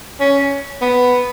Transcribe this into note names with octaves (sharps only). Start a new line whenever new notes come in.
C#4
B3